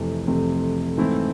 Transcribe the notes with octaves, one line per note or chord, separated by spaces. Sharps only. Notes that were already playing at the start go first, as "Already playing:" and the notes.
Already playing: F2 C3 E3 A3 C4
F2 C3 E3 A3 C4
G#2 E3 A3 C4 E4